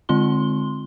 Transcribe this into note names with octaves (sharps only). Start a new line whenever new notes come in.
D3 G#3 C4 F4 C6 G7